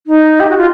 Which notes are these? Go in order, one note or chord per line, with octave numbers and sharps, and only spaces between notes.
D#4
G4
F#4
F4